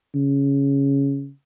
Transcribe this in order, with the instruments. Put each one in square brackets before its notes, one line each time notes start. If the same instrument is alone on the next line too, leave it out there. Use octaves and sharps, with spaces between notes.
[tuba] C#3